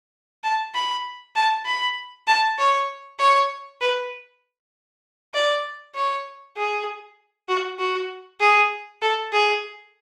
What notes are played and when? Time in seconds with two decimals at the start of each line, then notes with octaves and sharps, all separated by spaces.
0.44 A5
0.74 B5
1.35 A5
1.66 B5
2.27 A5
2.58 C#5
3.19 C#5
3.81 B4
5.34 D5
5.95 C#5
6.56 G#4
7.49 F#4
7.79 F#4
8.40 G#4
9.02 A4
9.32 G#4